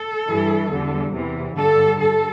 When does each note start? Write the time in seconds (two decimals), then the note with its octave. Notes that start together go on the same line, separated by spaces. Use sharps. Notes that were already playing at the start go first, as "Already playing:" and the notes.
Already playing: A4
0.28 G2 E3 G3
0.71 E2 D3 G3
1.13 E2 C3 E3
1.56 G2 D3 G3 A4
1.99 G2 G3 A4